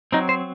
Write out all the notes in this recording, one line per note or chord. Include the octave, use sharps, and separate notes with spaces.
F#3 C4 D#4
C5